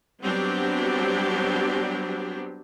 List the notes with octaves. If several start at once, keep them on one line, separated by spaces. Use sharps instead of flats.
F#3 G3 B3 C4 D4 G4